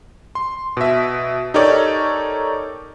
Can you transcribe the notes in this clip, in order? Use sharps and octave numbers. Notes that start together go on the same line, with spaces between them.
C6
B2 E5
D#4 G4 A4 A#4 C#5 D5